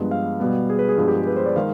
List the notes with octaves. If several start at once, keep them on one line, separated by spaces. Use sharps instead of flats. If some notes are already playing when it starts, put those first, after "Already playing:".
Already playing: G2 F3 G#3 B3
F5
B2 G3 B3
G#4
B4
G#4
G2 F3 G#3 B3
G4
G#4
B4
C5
D5
D#3 G#3 F5